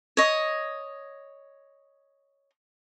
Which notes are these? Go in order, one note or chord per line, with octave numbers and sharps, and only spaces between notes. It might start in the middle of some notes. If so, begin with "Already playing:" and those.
C#5 D#5